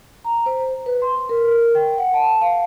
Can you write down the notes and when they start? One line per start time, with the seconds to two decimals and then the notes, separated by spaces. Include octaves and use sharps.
0.24 A#5
0.46 C5
0.86 B4
1.02 C6
1.29 A#4
1.75 G5
1.98 F#5
2.14 A5
2.42 F5